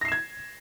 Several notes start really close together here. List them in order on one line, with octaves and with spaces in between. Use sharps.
A#6 C7 E7 G#6